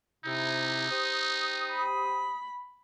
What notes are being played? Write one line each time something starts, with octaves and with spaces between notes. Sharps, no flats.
C3 D#4 E4
G4 C5 D#6
B5